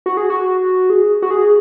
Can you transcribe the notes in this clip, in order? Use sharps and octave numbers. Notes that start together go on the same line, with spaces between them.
F#4
G#4
F#4
G#4
F#4
G#4